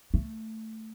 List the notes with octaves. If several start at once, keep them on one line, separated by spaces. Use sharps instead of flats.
A3